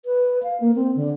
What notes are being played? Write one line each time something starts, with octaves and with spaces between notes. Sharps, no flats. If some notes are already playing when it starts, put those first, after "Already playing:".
B4
F5
A#3
C4
D3